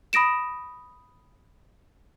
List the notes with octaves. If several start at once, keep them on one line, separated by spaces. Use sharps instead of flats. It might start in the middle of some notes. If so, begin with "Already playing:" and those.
B5 D#6 A#6 D7 E7